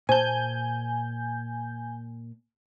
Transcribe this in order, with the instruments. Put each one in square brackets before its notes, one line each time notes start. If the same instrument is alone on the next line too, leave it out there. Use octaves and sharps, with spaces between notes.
[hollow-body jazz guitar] A#2 A5 [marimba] C5 [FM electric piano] G#5 G6